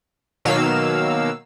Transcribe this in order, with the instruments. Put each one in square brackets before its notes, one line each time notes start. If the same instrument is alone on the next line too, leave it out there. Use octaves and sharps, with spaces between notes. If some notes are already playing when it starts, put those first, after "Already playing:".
[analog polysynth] B2 D#3 F#3 A#3 F5 E6